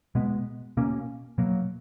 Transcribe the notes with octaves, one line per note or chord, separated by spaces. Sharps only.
B2 G#3 B3
B2 A#3 C#4
B2 F#3 A#3